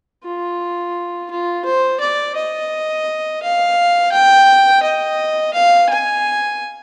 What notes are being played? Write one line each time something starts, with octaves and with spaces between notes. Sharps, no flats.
F4
F4
C5
D5
D#5
F5
G5
D#5
F5
G#5